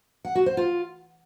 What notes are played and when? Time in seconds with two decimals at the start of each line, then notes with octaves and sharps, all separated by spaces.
0.25 F#5
0.35 F#4
0.46 C5
0.57 F4